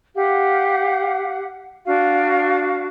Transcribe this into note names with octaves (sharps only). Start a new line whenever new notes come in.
G4 F5 F#5
D4 F#4 F5